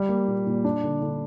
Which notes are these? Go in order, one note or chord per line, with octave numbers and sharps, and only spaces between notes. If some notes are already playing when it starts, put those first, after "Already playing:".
Already playing: G3
A#3
A#2
A#2
D4
D3
D3